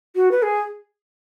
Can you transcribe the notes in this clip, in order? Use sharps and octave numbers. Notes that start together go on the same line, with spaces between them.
F#4
B4
G#4